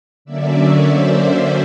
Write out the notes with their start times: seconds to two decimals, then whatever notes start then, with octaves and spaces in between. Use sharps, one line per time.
0.25 D3 F#3 A#3 C#4 D5 E5
0.86 C5 D5